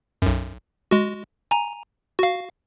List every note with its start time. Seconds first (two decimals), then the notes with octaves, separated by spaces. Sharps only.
0.22 B1 F#2
0.91 G#3 F#4
1.51 G#5 A#5
2.19 F#4 F5